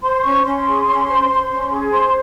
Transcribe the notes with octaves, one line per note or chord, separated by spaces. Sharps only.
C5 C6
C#4 C#6
C#4 C6
G#4
C#4
C5
C5
C#4
G#4
C5 C6